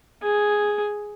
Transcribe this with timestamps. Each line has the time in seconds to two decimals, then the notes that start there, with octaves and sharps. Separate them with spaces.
0.23 G#4